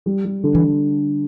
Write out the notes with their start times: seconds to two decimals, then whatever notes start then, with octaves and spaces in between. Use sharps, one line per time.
0.06 G3
0.24 G3
0.43 D3
0.55 E3